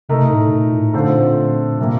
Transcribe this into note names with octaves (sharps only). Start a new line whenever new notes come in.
C3 A3 D#4 A#4
A2
A#2
A2
A#2 D3 A3 C4 F4 C5
C3 G3 A#3